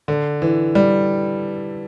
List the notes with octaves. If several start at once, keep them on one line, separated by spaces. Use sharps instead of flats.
D3
E3
G3